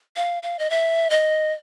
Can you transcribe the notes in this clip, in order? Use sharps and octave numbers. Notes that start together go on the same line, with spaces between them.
F5
F5
D#5
E5
D#5